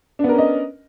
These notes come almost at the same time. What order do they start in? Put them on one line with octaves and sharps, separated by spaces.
D4 B3 A#4 C#4 D#5